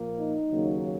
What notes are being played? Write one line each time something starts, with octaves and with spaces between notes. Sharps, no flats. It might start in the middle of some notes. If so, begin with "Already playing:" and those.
Already playing: A#2 F3 A#3
D#4
D#2 C#3 F#3 A#3